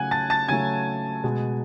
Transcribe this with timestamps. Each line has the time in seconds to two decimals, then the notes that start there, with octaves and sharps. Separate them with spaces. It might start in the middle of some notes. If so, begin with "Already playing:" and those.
Already playing: C#3 F#3 A3 F#5 G#5 F#6 G#6
0.11 A5 A6
0.30 A5 A6
0.48 C#3 F#3 A3 G#5 G#6
1.24 B2 G#3